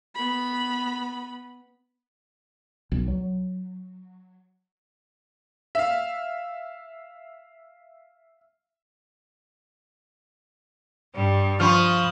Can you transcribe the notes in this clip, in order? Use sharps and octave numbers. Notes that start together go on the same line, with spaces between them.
B3 B5
B1
F#3
E5 F5
G2 G3
F3 B5 C#6 D#6 F6